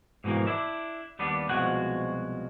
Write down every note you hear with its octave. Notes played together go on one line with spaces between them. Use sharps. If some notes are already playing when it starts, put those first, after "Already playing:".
G#2 B2 E3 F3 A#3
D4 E4
D#2 G3 B3 D4
C2 B2 F3 G#3 F#4 F#5